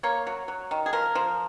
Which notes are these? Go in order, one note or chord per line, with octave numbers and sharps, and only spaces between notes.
A#3 C#5
F#3
F#3
D#3
G#4
F3 A#4
F3